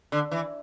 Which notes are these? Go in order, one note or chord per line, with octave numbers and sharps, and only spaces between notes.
D3
E3